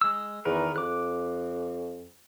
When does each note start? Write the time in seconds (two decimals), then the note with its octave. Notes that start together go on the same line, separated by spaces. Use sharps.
0.01 G#3 E6
0.45 E2 D#3 A#4 B4
0.76 F2 D6 F#6